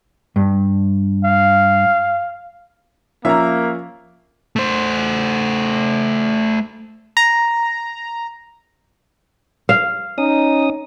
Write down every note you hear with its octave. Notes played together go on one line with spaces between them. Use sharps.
G2
F5
F3 A#3 C#4 E5 F5 A#5
A3 C5
A#5
F5
C#4 D#4 D#6